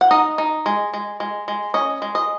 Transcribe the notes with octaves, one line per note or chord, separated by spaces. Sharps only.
F#5
D#4 D#5
D#4
G#3
G#3
G#3
G#3
C#4 D#5
G#3
D#5